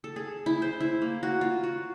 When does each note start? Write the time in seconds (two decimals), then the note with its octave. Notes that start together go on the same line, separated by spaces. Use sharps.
0.04 A4
0.16 G#4
0.46 E4
0.62 C5
0.80 E4
1.02 A#3
1.23 F#4
1.41 F4
1.63 F#4